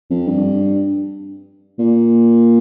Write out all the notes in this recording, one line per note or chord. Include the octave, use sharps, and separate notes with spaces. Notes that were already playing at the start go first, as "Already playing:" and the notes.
F2
G2
A#2